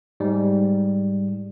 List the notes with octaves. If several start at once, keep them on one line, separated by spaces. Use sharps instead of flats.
G#2 G3